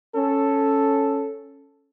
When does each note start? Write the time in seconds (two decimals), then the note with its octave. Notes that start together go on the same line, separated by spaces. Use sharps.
0.15 C#4 A4